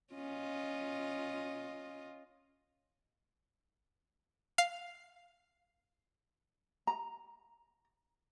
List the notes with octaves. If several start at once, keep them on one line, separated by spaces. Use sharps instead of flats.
C#4 F4 D#5
F5
A#5